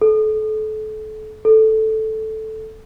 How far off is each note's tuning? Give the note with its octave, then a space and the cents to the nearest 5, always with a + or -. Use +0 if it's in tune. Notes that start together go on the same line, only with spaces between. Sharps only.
A4 -30
A4 -5